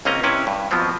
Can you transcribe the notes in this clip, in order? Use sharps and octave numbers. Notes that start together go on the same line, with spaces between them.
C#2 A#3 C4 C#4 D#5 A#5
C3 C#4 E4 B4
G2
B2 F3 F#3 B3 C4